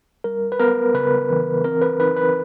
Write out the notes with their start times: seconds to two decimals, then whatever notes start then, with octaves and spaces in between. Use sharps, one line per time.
0.24 G3 A#4
0.52 B4
0.60 B3 A#4
0.94 C#3 B4
1.30 E3
1.64 C4 A#4
1.81 B4
2.00 D#4 B4
2.16 B4